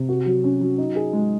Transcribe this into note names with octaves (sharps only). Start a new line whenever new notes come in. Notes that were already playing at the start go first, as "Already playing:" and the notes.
Already playing: C3
F#4
F#3
C#4
F#3
D#4
G#4
G#3